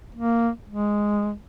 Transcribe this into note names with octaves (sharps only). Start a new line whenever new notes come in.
A#3
G#3